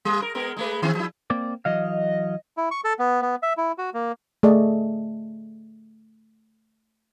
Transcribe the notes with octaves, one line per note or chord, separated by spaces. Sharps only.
G3
A#4
G#3 B3 A#4
G#3 A3 B4
D#3 C4
F3 E4
A#3 C4 D5
E3 F#3 D#5 F5
E4
C#6
A4
B3
B3
E5
E4
F#4
A#3
A3 G#4 D5 D#5